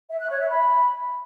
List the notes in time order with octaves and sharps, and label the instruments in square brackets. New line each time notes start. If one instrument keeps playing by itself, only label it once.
[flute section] E5
F#6
C#5
E5
B5